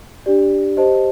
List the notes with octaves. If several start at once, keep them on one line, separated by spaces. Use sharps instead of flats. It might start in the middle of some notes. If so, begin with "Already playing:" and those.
D4 G4 D5
G4 C5 D#5 A5